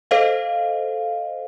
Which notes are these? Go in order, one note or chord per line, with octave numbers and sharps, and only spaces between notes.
A4 C5 D#5 F5